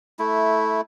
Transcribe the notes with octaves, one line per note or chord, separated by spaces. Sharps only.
A3 E4